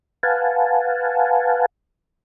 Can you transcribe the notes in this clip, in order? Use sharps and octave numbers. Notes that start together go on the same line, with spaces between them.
B4 F5 F#5 G#5 A5